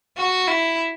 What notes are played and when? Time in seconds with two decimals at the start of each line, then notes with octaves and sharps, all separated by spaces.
0.17 F#4
0.47 E4